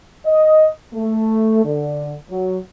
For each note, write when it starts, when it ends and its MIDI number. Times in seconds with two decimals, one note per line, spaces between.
0.26 0.67 75
0.94 1.64 57
1.65 2.15 50
2.30 2.58 54